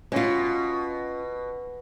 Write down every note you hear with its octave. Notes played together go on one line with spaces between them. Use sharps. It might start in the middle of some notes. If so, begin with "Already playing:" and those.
B2 C#4 F4